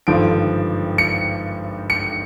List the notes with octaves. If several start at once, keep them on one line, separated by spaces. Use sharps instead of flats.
G#1 G2 D3 F3 D7
C#7
C#7